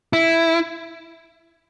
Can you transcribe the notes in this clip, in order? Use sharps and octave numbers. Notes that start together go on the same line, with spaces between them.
E4